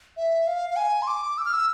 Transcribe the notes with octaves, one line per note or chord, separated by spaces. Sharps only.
E5
F5
F5
G#5
C6
D6
E6
F6
E6